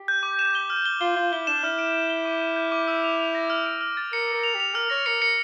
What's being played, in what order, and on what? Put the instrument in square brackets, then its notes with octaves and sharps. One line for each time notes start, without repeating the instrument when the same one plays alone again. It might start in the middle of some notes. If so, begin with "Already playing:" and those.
Already playing: [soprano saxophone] G4
[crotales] G6
D6
E7
G7
F6
G7
[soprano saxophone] F4 [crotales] G7
[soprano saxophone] F4 [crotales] G7
[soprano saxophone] E4 [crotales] G7
[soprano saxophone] D4 [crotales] E7
[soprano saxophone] E4 [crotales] F6
[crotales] D7
D7
G7
D6
G6
G6
D6
E6
F7
F7
A#6
F6
D7
F6
A6
[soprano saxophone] A#4 [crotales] C#7
[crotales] C#7
[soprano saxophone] A#4
[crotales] F7
[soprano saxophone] G4
[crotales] F7
[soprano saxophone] A#4 [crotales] F6
[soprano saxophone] C#5 [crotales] A#6
[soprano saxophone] A#4 [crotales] C#7
[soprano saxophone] A#4 [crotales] C#7